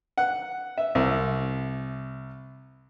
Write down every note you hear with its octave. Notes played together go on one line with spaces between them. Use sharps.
F#5
E5
C2